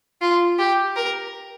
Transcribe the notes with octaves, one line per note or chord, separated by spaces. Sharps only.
F4
G4
A#4